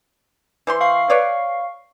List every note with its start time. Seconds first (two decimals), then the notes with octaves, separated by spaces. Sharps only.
0.67 E3 C5 C6
0.81 F5 C#6 C7
1.10 B4 C#5 D5